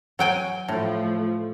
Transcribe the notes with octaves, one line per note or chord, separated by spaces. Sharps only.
F#3 G5 G#5
A2 F3 A3